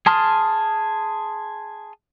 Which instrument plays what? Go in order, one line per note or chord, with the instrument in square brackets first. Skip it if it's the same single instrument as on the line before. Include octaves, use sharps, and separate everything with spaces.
[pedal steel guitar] G#4 A5 C6 D#6 F6